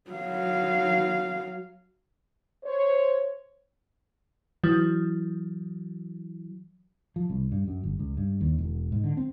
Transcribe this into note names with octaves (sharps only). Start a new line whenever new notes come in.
F#3 F5
C5 C#5
E3 F#3
F3
C2
G2
F#2
G1
C#2
G2
D#2
E1
G#2
D3
C4